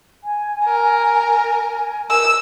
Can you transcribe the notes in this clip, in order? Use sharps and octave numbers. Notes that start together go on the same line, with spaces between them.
G#5
A#4
A#4 E6